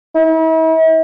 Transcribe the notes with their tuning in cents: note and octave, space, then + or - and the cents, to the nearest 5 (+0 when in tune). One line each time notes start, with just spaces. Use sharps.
E4 -45